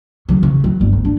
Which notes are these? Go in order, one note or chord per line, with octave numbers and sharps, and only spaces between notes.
C#3 F#3
C#3
F#3
G1
D2
D4